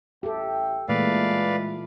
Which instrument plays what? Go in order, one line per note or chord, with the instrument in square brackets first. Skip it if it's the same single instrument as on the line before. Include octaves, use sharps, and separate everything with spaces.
[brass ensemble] A1 E5 G5 [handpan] G4 A4
[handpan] A#2 E3 A3 [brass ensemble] G#3 [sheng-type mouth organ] B4 D5 F5